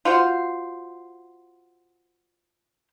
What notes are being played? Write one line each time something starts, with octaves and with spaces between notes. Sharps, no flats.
F4 F#4 C5